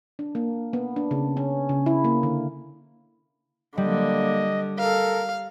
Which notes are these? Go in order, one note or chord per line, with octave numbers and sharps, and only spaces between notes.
D4
A#3
B3
D4
C#3
C#4
C#3
E4
A#3
D3
D3 G3 A#3 D#5
A4 A#4 F5